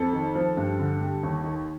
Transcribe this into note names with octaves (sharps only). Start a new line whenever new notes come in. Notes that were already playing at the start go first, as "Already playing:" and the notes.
Already playing: F2 A4
D#3
F3
G2
D3
G3
D#2
D#3